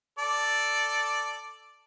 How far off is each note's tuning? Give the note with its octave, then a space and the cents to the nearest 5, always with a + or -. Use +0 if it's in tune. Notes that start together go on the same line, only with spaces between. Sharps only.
A4 +0 D5 +0